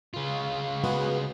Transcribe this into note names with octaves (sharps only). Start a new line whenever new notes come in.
C#3 F4
G#3 B3 F#4